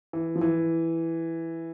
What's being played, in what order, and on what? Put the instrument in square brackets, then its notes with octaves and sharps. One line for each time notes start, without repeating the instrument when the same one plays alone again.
[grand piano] E3
F3
E3